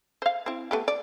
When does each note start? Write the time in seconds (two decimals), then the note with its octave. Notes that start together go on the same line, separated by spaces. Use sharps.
0.22 C5 F5
0.46 C4 E4
0.71 A3 B3 G4
0.88 D5